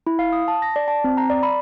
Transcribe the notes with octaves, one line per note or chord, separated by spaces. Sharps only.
E4
F5
D#6
A5
A#6
D5
A5
C4
A#5
D5
B5